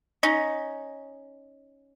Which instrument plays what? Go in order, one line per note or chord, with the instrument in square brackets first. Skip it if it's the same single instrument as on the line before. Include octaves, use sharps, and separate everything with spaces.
[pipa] C#4 D#4